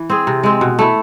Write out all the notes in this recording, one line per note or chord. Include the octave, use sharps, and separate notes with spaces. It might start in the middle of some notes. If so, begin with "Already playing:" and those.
Already playing: E3
C4 G#4
C3
G#3 C4
B2
A3 E4